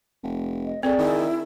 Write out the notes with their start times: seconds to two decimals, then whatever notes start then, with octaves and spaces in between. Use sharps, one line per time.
0.23 F1
0.64 D#5
0.83 C4 G#4 A4 D5 G#5
0.99 D#3 E4